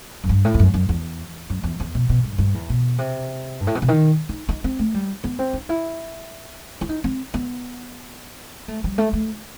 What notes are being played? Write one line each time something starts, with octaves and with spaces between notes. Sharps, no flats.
F#2
G2
A2
E2
F#2
F#2
E2
F#2
E2
E2
B2
B2
G2
G2
E2
B2
C3
G2
A2
B2
C3
D#3
D#4
D#4
C4
A3
G3
B3
C4
D#4
E4
E4
D#4
C4
B3
A3
G3
A3
A3